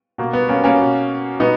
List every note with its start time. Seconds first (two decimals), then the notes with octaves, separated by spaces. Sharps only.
0.18 B2 A#3
0.33 B3
0.49 A#3 C#4
0.64 A#3 C#4
0.80 B2
1.40 B2 B3 D#4